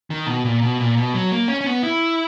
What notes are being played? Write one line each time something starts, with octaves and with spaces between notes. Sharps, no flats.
D#3
B2
A#2
B2
A#2
B2
F#3
A#3
C#4
C#4
B3
E4